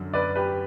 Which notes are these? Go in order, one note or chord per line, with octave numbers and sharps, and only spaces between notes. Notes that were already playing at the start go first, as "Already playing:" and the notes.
Already playing: F#2 D3 F#3
B4 D5
G4 B4